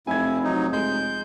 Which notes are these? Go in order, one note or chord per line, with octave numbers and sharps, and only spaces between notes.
F1 F2 E4 G#5 G#6
F#3 D#4
G#3 G6